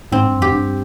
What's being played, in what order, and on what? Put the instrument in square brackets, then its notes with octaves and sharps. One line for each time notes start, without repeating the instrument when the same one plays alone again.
[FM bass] G#2 [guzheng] C4
[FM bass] G2
[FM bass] F2 [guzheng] G4
[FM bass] G2